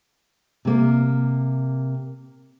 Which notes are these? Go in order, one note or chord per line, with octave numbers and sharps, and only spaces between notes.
C3 A#3